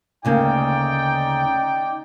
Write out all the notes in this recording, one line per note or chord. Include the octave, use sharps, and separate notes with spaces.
D2 C#3 A#3 D#4 D5 G5